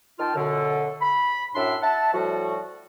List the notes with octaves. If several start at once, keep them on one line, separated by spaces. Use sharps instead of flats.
D#3 F4 G5 A5 F6
F#2 B2 D3
B5
F#2 A2 D4 E5 C6
E5 F#5 A5
A2 F3 G3 F#4